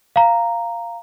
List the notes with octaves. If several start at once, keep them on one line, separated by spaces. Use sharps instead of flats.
F5 A#5